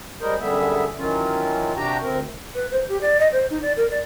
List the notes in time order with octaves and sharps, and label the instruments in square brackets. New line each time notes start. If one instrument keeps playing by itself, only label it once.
[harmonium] G3 G#3 G#4 A#4 C5
F#2 D3 G3 B3 G#4 E5
D#3 E3 F#3 C#4 F4
C3 D4 F#4 G4 G5 A#5
D2 C4 A#4
[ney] B4
C5
G4
D5
D#5
C5
D#4
D5
A#4
D5